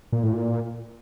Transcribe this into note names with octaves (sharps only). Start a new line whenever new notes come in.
A#2
A2
A#2